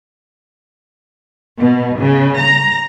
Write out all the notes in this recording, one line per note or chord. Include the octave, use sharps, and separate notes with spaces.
B2
C#3
A#5